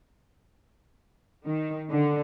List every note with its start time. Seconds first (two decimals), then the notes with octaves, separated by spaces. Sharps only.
1.47 D#3
1.91 D3